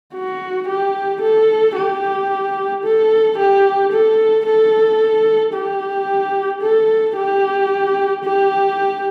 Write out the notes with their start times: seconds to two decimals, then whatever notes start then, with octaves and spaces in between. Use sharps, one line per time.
0.14 F#4
0.68 G4
1.22 A4
1.76 G4
2.84 A4
3.38 G4
3.92 A4
4.46 A4
5.54 G4
6.62 A4
7.17 G4
8.24 G4